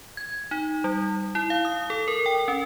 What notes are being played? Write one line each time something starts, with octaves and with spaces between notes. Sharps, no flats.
G#6
D#4
G3
E4
F5
D#6
A4
A#4
G5
C#4